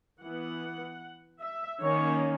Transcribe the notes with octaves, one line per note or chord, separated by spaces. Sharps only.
E3 B3 F#5
E5
D#3 A#3 C#4 C#5